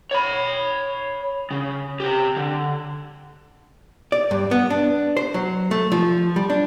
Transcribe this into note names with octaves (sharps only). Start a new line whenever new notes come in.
C#5 B5
C#3
C3 G4
D3
D5
G2
B3
D4
C5
F#3
A3
F3
G3
D4